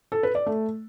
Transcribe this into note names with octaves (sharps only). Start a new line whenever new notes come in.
A4
B4
D5
A3